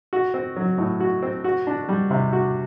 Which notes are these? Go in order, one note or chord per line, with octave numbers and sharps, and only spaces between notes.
F#4
C4
F#3
A2
F#4
C4
F#4
D4
G3
C3
F#4